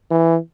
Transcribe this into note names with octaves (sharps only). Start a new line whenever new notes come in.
E3